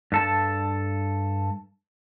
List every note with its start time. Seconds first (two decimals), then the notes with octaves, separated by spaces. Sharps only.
0.12 G2 A4 A5